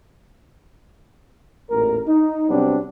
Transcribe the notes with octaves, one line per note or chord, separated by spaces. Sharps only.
A1 E2 A#2 A#4
D#4
C3 F#3 G3 B3 C4 D4